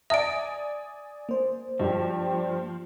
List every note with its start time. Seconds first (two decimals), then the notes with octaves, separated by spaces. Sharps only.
0.10 D5 E5 G#5 D#6 D7
1.29 A#3 C5
1.80 G2 F3 G3 G4